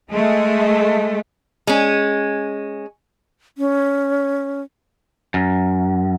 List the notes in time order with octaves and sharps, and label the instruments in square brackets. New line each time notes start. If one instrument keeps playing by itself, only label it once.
[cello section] G#3 A3
[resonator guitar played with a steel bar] G#3 C#4
[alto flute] C#4
[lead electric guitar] F#2